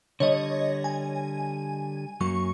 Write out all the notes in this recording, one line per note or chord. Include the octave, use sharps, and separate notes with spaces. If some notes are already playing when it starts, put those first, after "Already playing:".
D3 G3 C#5 D#5
G#5
F#2 F#3 A#3 C#6